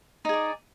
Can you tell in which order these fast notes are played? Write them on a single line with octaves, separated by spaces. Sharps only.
D#4 G#4 D5